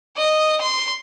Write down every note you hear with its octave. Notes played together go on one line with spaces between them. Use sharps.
D#5
C6